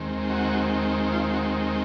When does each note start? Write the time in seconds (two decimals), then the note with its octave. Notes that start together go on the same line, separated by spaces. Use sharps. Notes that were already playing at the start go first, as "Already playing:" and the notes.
Already playing: D#2 D#3 G#3 C4
0.30 F#4
1.12 F4
1.33 F#4